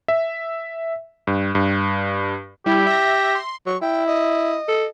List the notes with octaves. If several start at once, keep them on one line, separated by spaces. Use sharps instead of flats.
E5
G2
G2
G3 E4 G4
E5 A#6
C6
F#3 C#6
E4 G5
D#5
A4